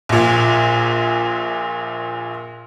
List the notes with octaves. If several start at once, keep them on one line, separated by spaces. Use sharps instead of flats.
A#1 A#2